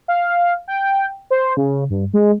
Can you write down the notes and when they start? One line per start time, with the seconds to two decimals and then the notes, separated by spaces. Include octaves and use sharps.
0.08 F5
0.68 G5
1.31 C5
1.57 C#3
1.90 G2
2.13 G#3